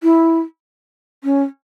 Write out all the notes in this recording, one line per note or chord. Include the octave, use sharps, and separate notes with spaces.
E4
C#4